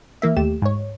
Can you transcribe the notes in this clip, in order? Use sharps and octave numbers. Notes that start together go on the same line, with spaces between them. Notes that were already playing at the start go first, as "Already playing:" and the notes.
E3 A#3 E5
D#2 A3 G4 E7
G#2 C#5